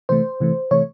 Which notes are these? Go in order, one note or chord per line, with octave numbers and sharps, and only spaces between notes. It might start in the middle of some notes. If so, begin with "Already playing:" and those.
C3 E3 A3 C5
C3 E3 A3
C3 E3 A3 C#5